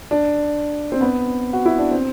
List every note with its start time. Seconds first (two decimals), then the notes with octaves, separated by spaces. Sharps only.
0.11 D4
0.92 C4
1.01 B3
1.53 F#4
1.66 E4
1.79 D4
1.91 C4